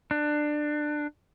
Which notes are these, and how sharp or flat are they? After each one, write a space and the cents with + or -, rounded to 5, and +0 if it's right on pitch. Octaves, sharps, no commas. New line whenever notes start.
D4 +20